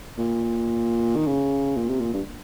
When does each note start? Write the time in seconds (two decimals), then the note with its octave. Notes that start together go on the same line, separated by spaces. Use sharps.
0.18 A#2
1.16 D#3
1.27 C#3
1.76 A#2
1.89 C3
2.00 A#2
2.14 G2